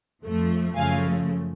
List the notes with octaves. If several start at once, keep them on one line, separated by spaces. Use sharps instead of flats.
F2 F3 A3
F#2 C#3 F3 A3 F5 G#5